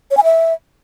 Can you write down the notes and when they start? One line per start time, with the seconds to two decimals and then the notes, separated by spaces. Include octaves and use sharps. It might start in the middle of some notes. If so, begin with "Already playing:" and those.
0.11 C#5
0.17 G#5
0.24 E5